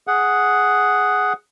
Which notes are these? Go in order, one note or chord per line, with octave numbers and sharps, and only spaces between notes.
G#4 F#5